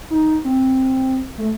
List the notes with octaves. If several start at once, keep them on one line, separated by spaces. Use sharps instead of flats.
D#4
C4
A3